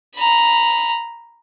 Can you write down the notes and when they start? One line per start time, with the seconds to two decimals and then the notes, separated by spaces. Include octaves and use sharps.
0.15 A#5 B5